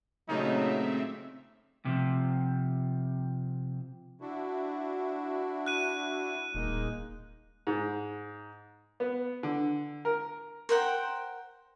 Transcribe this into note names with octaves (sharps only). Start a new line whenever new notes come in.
A#2 C#3 F#3 A3 C4 D#4 E5
C3 F3
D4 E4 F#4
F#6 D#7
D#1 G#3 A#3 D#4
G#2
B3
D3
A#4
A#4 C5 F#5 G5